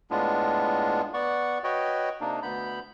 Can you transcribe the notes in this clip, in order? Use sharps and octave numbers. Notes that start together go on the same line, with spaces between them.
A2 G#3 B3 D4 F4
B3 D5 F#5 C#6
F#4 B4 C#5 D#5 G5
C3 A#3 D4 D#4
D2 B3 B5 G6